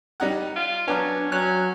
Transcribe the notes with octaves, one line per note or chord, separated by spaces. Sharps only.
G3 D#4 F#5
F4
F#3 B3 C#4 D4
F#3 C#4 F#6